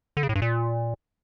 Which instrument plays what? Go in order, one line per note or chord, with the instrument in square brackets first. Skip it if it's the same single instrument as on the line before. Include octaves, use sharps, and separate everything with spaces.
[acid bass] D3
C#3
A2
G2
A#2